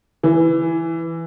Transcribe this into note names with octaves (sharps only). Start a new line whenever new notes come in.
E3